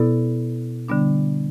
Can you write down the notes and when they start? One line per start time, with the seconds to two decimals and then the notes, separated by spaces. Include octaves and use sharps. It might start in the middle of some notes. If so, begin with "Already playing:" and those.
Already playing: B2 B3 E4 A4 D5
0.88 D3 G3 B3 D4